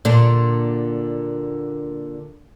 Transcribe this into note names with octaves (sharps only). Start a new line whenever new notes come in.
A#2 D3 D4